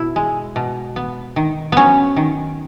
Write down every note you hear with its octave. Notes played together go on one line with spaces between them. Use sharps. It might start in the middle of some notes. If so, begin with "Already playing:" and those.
Already playing: B2 E4
G#3
B2
B3
D#3
F#3 B3 C#4
D#3